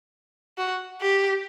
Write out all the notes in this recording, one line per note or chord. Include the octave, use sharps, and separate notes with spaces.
F#4
G4